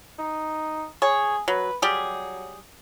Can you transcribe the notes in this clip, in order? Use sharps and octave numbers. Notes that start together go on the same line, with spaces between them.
D#4
G#4 C#5
F#3 B4
F#3 G3 G4 G#4